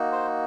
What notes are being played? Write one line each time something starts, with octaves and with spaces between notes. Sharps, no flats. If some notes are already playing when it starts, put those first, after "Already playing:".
Already playing: A#3 D#4 F#4
C5